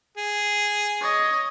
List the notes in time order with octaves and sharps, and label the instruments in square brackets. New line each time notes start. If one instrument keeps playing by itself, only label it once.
[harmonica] G#4
[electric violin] C#5 D#5